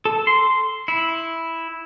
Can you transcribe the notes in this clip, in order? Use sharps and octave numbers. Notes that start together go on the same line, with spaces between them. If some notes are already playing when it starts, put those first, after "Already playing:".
A4
C6
E4